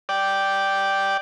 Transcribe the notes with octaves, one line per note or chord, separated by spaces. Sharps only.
D5 G5